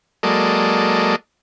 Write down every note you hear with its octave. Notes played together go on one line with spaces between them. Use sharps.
F#3 G#3 A#3 A4 D5 D#5